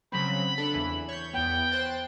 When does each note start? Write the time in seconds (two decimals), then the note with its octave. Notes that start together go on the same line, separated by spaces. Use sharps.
0.12 C#3 F#3 C4 B5
0.58 D4 A4
0.74 E2 E3
1.09 C#5 G6
1.33 E2 B3 G5
1.72 C5 F#6 A6